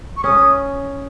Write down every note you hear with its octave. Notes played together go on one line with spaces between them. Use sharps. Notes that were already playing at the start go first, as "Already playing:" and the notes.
C#6
C#4 D#6